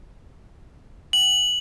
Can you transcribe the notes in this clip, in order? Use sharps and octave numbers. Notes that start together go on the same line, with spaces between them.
F#7